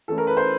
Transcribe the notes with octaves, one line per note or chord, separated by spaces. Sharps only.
E3 A3 C#4 E4 A4
A#4
B4
C5